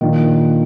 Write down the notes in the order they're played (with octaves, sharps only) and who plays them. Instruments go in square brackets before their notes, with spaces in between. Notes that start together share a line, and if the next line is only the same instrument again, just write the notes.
[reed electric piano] A#2 F3 A#3 D4 F4 [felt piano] D#3